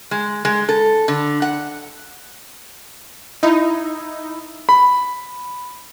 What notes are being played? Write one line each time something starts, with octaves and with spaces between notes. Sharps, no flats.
G#3
G#3
A4
D3
F#5
D#4 E4
B5